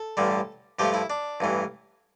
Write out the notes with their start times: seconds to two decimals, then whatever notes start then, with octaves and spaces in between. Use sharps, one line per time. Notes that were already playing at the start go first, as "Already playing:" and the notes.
Already playing: A4
0.17 A1 G2 D3 G3
0.79 G2 F3 A3 G4
0.94 E4
1.10 D4
1.40 A1 G2 E3